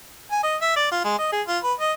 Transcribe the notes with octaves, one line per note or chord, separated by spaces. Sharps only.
G#5
D#5
E5
D5
F4
G#3
D#5
G#4
F4
B4
D#5